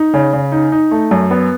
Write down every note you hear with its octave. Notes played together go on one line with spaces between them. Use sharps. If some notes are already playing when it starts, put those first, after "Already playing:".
Already playing: D#4
C#3
C#3
D#4
D#4
A3
F#2
B3